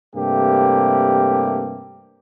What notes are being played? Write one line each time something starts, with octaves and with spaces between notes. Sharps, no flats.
G2 C3 A3 A#3 G4